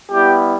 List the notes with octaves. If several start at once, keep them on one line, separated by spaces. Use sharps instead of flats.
G3 B3 E4 G4